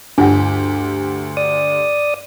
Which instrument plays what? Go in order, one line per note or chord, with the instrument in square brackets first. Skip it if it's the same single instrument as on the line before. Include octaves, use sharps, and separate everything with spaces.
[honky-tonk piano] D2 G4 [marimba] G2 F#5 [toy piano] D4
[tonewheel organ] D5 D#6